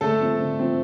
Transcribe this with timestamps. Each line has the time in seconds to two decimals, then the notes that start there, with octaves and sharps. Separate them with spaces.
0.01 D3 A3 A4
0.21 F3 C4
0.39 D3
0.59 F3 C4